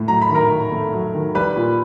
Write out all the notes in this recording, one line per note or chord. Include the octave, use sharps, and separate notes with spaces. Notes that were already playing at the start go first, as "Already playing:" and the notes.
Already playing: A2
F#3 A#5
B5
D#3
A#4 A#5
D#3
A3
F#3
D#3
G3 B4 B5
A#2